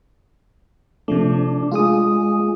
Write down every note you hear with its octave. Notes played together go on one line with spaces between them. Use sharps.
C3 F3 A3 D4
G#3 F4 G#4 D#6